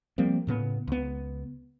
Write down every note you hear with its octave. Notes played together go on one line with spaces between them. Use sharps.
F3 G3 A#3 C4
A2 C#3 B3
C#2 B3